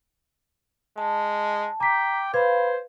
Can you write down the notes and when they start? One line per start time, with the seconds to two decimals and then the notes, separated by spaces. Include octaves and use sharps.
0.98 G#3 A5
1.80 G5 A#5 D6 B6
2.34 B4 C5 F5 B5 G#6